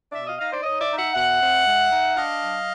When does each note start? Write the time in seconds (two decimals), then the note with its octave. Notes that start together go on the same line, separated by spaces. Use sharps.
0.12 B2 D5 E5
0.26 D#5 F5
0.38 D#4 D#5 F5
0.51 C5 D5
0.63 D#4 C#5 D#5
0.80 D5 E5
0.89 D#4
0.97 E5 F#5
1.13 B2 E5 F#5
1.39 C4
1.65 G#3
1.90 D#4
2.15 D4 D#5 F5
2.40 F#3